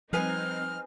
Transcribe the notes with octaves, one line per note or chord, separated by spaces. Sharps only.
F3 G3 C4 D#4 G#4 B4 G#5 F6